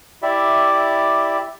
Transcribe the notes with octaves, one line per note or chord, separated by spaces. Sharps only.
E4 G4 D5 E5